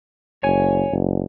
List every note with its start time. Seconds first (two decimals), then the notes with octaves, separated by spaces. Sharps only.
0.43 F#1 C#5 G#5
0.92 F#1